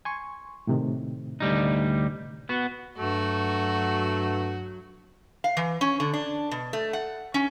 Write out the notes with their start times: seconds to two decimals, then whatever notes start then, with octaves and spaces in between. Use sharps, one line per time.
0.05 G#5 C6 C#6
0.67 A2 C3 D#3
1.40 D2 G3 D#4
2.49 B3 F#4
2.98 G2 F#3 A3 F#4
5.44 F5
5.57 E3
5.81 C#4
6.00 D3
6.13 D4
6.51 B2
6.73 A3
6.93 F#5
7.34 C#4